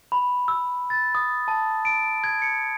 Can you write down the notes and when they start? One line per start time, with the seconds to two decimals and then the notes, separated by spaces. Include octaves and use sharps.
0.12 B5
0.48 E6
0.90 A6
1.15 D#6
1.48 A5
1.85 D7
2.24 G#6
2.42 C#7